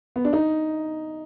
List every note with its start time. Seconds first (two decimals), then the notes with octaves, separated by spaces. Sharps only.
0.16 B3
0.25 D4
0.33 D#4